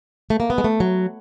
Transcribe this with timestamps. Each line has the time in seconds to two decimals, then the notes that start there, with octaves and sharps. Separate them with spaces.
0.30 A3
0.40 A#3
0.50 B3
0.58 G#3
0.64 A3
0.80 F#3